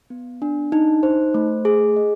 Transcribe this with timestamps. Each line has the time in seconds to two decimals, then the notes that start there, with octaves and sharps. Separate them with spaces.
0.10 B3
0.42 D4
0.72 D#4
1.03 C5
1.34 A3
1.65 G#4
1.96 D#5